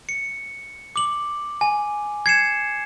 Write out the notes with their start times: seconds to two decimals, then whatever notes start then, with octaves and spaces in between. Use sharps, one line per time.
0.09 C#7
0.96 D6 F#7
1.61 G#5
2.26 G#6 C7 C#7 E7